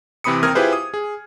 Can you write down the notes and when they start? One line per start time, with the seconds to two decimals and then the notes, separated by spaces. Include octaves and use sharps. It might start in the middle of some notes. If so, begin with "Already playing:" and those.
0.24 C3 E3 C4 B5 D#6 C#7
0.43 D#2 C4 A#4 D#6 F6 G#6
0.55 E4 F4 G4 G#4 B4 C5
0.73 D#6
0.94 G#4